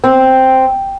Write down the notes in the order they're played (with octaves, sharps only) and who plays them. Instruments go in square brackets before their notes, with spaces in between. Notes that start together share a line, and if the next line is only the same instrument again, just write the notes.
[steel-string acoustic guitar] C4